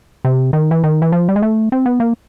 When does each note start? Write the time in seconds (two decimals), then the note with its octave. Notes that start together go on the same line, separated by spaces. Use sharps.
0.25 C3
0.53 D#3
0.71 E3
0.84 D#3
1.02 E3
1.12 F3
1.29 G3
1.36 G#3
1.42 A3
1.72 C4
1.86 B3
2.00 A#3